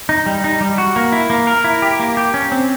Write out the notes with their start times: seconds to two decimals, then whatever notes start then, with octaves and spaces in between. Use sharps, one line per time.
0.09 D#4
0.26 G3
0.44 D#4
0.61 G3
0.78 F#4
0.96 A#3
1.12 E4
1.30 A#3
1.47 A#4
1.64 E4
1.82 G4
2.00 A#3
2.17 G4
2.34 C#4
2.52 C4